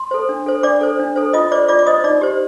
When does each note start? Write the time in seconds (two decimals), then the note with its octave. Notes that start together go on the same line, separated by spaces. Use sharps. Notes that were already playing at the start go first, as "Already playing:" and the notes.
Already playing: C6
0.11 A4 C5
0.29 D4
0.46 A4 C5
0.63 D4 D5 D6
0.81 A4 C5
0.99 D4
1.16 A4 C5
1.33 F4 D#5 D#6
1.52 C5 D5 D6
1.68 F4 D5 D6
1.79 D6
1.86 C5 D#5 D#6
2.04 D#4 D5 D6
2.21 G4 C5